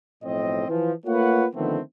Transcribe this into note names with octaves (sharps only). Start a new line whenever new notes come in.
B1 A2 F3 C4 D#5
E3 F3
A3 A#3 F4 B4 C#5 F#5
D3 D#3 F3 A3 B3 C4